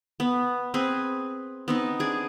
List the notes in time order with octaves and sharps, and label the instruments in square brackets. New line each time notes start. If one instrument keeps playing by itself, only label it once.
[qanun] B3
C4 G#4 B4
B3 C4 D#4
D4 G#4 D5